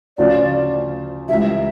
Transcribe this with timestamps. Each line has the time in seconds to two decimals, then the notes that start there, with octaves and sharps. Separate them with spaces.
0.18 D2 C#3 F3 C#4 F4 D5
1.28 C#2 C#3 E3 G3 E5